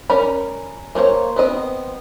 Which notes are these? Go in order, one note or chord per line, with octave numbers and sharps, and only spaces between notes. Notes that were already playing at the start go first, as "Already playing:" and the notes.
C#4 A#4 D5 B5
A#3 D4 C5 C#5
B3 C4 D#5